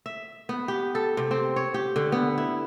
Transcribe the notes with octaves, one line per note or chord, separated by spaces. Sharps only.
E5
B3
G4
A4
C3
C4
C#5
G4
D3
B3
E4